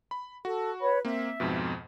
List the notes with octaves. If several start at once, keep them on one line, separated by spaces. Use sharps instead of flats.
B5
F#4 A4
B4 C#5 B5
A#3 C4 E5
F2 G#2 B2